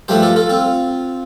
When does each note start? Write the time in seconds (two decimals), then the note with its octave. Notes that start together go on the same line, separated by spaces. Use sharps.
0.08 G2 F3 A3 G4 C5
0.23 F4 A4
0.36 F4 A4
0.49 C4 F4